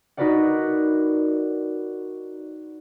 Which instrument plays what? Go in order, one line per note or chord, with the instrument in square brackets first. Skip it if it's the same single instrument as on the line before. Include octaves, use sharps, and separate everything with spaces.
[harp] D#4 F#4 A#4 B4 D5 F#5